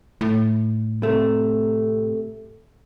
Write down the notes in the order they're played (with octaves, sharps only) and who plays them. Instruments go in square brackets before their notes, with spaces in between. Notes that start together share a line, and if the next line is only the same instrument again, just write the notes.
[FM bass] A2
[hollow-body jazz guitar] C3 A3